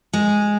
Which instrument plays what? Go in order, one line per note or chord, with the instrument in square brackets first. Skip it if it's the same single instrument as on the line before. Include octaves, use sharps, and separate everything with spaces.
[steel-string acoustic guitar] G#3